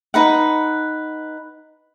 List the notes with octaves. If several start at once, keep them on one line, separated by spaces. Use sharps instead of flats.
D#4 B4 F#5